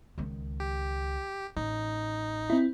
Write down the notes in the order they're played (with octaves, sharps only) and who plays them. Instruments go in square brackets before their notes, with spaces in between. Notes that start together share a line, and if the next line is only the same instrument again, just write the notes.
[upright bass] C#2 D#3
[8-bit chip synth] G4
[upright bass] A1 [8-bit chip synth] D#4
[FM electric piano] C4 E4